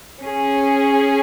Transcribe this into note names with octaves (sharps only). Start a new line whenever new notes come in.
C#4 G#4